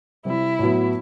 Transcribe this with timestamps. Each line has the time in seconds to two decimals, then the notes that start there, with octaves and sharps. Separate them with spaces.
0.25 C3 G3 C4 E4
0.59 A2 F#3 B3